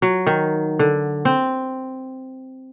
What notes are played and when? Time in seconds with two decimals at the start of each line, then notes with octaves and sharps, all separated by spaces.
0.02 F#3
0.27 D#3
0.79 D3
1.25 C4